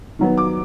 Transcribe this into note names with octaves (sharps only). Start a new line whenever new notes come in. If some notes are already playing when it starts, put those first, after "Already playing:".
D#3 F#3 B3
D6